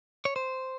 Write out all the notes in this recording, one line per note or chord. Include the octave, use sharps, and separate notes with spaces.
C#5
C5